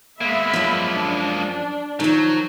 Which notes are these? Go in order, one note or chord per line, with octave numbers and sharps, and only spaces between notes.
G#3 A#3 B3 E5 B5
F#2 F3
D4
D#3 F3 F#3